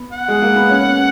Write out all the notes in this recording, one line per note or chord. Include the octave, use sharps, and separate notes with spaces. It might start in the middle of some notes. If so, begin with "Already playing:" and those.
Already playing: B3
F#5
G#3
A#3
B3
C#4